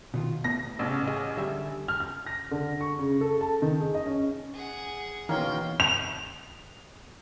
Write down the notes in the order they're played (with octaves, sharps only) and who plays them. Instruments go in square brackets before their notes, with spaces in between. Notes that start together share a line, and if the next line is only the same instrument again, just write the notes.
[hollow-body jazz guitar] B2 D#3 F4
[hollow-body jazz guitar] A2 B3 [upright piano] A#6
[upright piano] A1 C#3
[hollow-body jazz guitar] G#4 D#5
[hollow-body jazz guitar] D3 E5 G#5 [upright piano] G3
[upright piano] F6
F6
A#6
D3
C#6
C#3
A4
A5
D#3
G#4
D#5
C#4
[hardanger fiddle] G#4 F#5
[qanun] B2 D#3 [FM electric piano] E3 [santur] A#3 C#4 [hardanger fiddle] G5 C6
[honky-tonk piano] F7